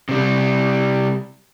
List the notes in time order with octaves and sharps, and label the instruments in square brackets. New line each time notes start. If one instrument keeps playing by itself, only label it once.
[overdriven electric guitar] C3 G3